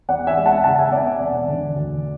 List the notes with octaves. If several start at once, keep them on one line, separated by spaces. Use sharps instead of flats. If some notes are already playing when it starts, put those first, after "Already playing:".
E2 D5 F#5
E5 G#5
G#3
F#5 A5
C#3 F#5 A5
E5 G#5
B3 D5 F#5
D5 F#5
E1
D3
D2